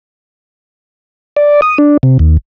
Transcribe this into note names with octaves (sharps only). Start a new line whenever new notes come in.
D5
D#6
D4
C3
D#2